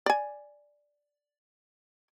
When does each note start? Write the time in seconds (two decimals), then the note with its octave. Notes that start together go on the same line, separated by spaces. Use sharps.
0.06 D5 G#5